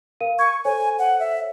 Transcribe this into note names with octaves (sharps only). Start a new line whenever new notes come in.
A#4 F5 D#7
C#6 G#6
A4 C5 C#5 G#5
F#5
E5